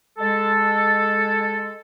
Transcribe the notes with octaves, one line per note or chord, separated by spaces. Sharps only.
G#3 A4